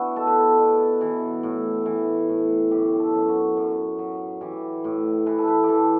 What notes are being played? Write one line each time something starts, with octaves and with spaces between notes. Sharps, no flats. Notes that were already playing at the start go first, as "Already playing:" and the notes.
Already playing: B3 D4 E4 F#4
B2 A4
B4
A4
B2
E3
A2
E3
A2
F#2 G4
G4
A4
F#2
F#4
F#2
F#3
E3 G4
A2
E3 B4
A4
B4
G4
E3 A4